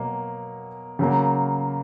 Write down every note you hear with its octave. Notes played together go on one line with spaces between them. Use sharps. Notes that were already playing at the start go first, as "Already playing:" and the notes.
Already playing: B2 F#3 A#3
C#3 F#3 A#3